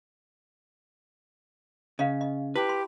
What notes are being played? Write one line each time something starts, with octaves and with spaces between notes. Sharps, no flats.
C#3 D#5 F5
D#5
E4 G4 B4
C6